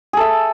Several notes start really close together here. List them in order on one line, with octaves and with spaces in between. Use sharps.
G#4 A4 E5